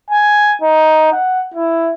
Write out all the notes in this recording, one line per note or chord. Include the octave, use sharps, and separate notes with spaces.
G#5
D#4
F#5
E4